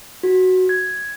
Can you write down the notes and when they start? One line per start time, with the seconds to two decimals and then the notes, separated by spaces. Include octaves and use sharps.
0.23 F#4
0.69 G#6